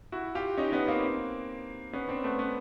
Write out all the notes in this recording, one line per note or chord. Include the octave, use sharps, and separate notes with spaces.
E4 F#4
F4 G4
C#4 D#4
B3 C#4
A#3 C4
B3 C#4
C4 D4
A3 B3
B3 C#4